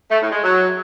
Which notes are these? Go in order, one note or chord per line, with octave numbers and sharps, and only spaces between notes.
A3
A2
G#3
F#3